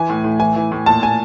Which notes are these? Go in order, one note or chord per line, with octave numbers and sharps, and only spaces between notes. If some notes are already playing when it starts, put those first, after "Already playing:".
Already playing: E3 G#5
A2
A2
E3 G#5
E3
A2
A#2 A5
A#2 G#5